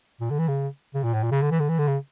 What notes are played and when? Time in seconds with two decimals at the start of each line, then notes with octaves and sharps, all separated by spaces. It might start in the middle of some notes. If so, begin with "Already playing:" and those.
0.21 A#2
0.30 D3
0.39 E3
0.48 C#3
0.95 C#3
1.04 A#2
1.14 A2
1.23 A#2
1.32 C#3
1.42 D3
1.52 E3
1.60 D3
1.69 E3
1.79 D3
1.88 C#3